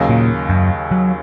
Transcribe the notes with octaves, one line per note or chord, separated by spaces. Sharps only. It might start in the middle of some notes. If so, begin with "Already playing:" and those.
Already playing: D#2 C#3 F#3 D#4
A#2
F#2
F#3